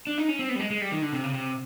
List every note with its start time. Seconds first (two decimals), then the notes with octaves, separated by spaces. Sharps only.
0.07 D4
0.18 D#4
0.29 C#4
0.39 C4
0.49 B3
0.55 G3
0.59 G#3
0.70 G#3
0.81 G3
0.92 D#3
1.02 D3
1.12 C3
1.23 C#3
1.33 C3